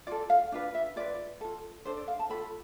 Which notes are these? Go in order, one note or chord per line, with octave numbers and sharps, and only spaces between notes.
F4 A4 D5
F5
D4 F4 B4
E5
F4 B4 D5
F4 A4
D4 A4 C5
D5
F5
A5
F4 A4 B5